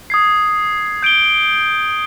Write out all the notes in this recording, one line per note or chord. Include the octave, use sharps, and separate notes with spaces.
D#6 G#6 C7
G6 D7 G7